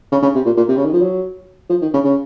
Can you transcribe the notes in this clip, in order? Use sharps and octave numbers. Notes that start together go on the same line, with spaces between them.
C#3
C#3
C3
A#2
A#2
C3
C#3
D#3
F3
F#3
F3
D#3
C#3
C#3